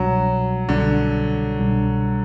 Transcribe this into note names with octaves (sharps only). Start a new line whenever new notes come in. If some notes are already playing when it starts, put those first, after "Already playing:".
Already playing: C2 B2 F#3 G3 D4
C2 B2 D3 G3 D4
C2 B2 G3 D4